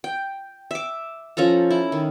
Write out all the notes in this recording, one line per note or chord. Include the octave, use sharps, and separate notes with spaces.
G5
E5 D6
F3 C#4 A4 A#5
E4
D#3